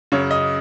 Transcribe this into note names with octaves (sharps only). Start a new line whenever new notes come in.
F#2 C#3 C#5
D#5